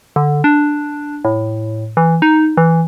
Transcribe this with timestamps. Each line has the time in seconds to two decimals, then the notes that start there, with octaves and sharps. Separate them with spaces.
0.16 D3
0.44 D4
1.25 A2
1.97 E3
2.22 D#4
2.57 E3